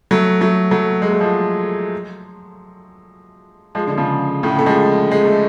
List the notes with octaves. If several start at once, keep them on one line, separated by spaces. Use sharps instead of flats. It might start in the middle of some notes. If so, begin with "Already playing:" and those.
F#3 A3
F#3 A3
F#3 A3
G#3
A3
F3 G#3
F3 G#3
D3
C#3 F3
A2 C#3
A3
F3 G#3
G#3
A3